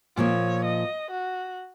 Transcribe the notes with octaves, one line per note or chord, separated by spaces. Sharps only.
A#2 F3 A#3 C#5
D#5
F#4